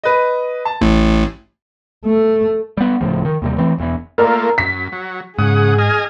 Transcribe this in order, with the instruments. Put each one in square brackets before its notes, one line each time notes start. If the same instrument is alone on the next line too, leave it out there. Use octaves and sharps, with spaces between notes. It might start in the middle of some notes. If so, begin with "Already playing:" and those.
[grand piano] B4 D#5
A5
[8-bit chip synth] A1 A2
[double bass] A3
[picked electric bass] G3 B3
D1 C#2 A2 F3
D#3
D#2 C3 G3
E3 A3 C4
E1 E2 G#2 E3
[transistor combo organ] A3 A#3 F4 [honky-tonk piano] A#4 D5 A#5
[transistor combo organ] F#2 [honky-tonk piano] B6
[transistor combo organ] F#3
[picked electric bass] G#2 [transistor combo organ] C#3 F#5 D#6 [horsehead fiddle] G#4
[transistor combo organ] D#5 G#5 F6